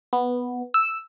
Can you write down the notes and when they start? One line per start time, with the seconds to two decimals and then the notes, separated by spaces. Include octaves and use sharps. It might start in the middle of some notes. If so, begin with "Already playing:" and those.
0.13 B3
0.74 E6